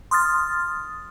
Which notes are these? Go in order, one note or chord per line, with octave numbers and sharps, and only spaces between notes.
C6 D#6 F6 A6